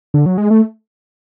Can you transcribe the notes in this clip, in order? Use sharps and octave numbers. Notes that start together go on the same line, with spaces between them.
D3
F#3
G#3
A3